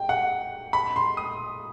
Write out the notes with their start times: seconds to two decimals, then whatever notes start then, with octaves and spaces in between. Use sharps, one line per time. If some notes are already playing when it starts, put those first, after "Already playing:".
Already playing: G5
0.09 F#5
0.73 B5
0.96 C6
1.17 D#6